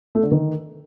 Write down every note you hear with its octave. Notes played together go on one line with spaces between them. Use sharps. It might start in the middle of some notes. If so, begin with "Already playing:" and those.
A3
D3
D#3